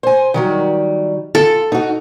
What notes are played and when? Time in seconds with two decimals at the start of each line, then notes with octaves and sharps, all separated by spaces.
0.03 C5 G#5
0.34 D#3 F#3 G3
1.35 F4 A4
1.72 D#4 F#4